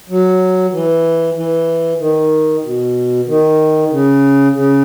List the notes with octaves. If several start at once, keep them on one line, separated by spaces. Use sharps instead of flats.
F#3
E3
E3
D#3
B2
D#3
C#3
C#3